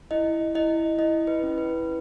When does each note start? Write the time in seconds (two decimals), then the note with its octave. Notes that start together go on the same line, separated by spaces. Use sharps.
0.11 E4 D#5
0.55 E4 D#5
0.98 E4 D#5
1.27 B4
1.43 C#4
1.58 B4